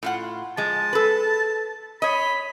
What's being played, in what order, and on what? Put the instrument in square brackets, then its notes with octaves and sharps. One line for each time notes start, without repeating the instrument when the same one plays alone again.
[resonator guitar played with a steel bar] A2 F4 F#5
[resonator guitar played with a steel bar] F3 G#3 [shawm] A5
[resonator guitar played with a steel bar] A4 B4
[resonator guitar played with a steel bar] C#5 D#5 [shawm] B5